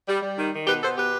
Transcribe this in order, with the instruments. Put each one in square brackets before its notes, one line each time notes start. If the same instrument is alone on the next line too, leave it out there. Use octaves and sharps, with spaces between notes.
[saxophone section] G3
G3
D#3
D#3
B2 G4 B4
B3 A4 C5
B2 G4 B4